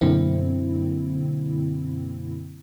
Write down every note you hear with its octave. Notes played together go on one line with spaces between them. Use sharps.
F#2 B2 D3 A#3 C4 E4